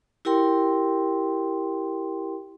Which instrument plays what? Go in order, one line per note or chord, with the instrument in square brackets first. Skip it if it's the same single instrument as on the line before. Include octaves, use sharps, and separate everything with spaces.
[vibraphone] E4 G4 A#4 G5 C6